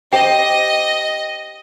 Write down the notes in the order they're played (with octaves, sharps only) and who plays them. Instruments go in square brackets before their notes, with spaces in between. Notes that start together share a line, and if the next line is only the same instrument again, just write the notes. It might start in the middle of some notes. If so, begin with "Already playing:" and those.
[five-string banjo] G4 C5 [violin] D#5 [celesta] G5